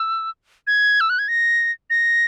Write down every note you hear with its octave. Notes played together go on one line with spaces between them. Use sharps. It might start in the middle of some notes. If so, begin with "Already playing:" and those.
Already playing: E6
G#6
E6
F#6
G#6
A#6
A#6